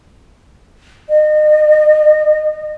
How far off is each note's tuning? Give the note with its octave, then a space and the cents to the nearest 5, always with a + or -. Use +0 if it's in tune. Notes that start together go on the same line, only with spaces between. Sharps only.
D#5 -35